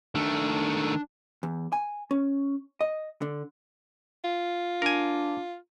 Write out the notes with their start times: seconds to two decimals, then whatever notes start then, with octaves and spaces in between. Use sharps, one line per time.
0.15 D#3 A3 D4
1.43 E2
1.73 G#5
2.11 C#4
2.81 D#5
3.22 D3
4.24 F4
4.82 D4 A#4 G#5